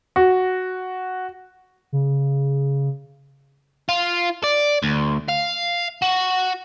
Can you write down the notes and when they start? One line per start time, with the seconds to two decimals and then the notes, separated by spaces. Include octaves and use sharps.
0.16 F#4
1.92 C#3
3.89 F4
4.44 D5
4.83 D2
5.28 F5
6.02 F#4